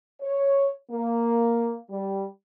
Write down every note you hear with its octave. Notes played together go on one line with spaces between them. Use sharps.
C#5
A#3
G3